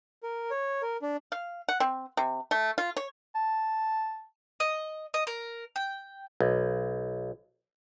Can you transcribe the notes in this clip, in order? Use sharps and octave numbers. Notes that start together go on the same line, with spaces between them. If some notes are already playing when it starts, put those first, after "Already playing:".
A#4
C#5
A#4
D4
F5
F#5
C4
C3
A3
F4
C#5
A5
D#5
D#5
A#4
G5
B1